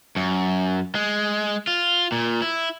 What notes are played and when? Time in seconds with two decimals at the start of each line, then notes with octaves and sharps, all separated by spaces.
0.16 F#2
0.95 G#3
1.67 F4
2.12 A#2
2.42 E4